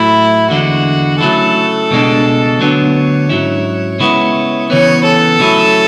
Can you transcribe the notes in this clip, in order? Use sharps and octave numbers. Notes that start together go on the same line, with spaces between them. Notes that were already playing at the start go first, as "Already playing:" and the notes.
Already playing: A2 F#3 A3 E4
E2 D3 G#3 D4 F#4
C#3 F#3 A3 E4 A4
C#2 B2 G#3 D4
D2 D3 F#3 B3 D4 C#5
G#2 F#3 C#4 E4
C#3 G#3 B3 E4
C#3 E3 B3 C#5
A4
C#3 F#3 A3 C#4 E4